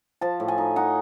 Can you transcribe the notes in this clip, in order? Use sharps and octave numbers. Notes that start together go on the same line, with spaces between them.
F3 A5
A2
G#5
D#4
D#4 F#5